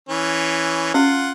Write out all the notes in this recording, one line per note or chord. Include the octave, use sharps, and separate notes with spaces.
E3 C#4
C#4 F4 F#5